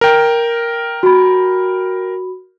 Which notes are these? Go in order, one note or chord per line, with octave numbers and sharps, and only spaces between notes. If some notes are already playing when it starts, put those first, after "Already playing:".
A#4 G5
F#4 B5